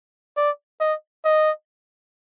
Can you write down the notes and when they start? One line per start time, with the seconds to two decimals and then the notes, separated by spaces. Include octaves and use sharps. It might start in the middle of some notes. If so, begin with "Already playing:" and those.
0.37 D5
0.81 D#5
1.25 D#5